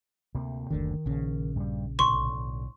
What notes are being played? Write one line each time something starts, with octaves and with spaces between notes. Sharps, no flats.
D2 C3 A#3
F#1 D2 D3 D#3
A#1 C#3
G2 G3
B1 A2 D3 C6 C#6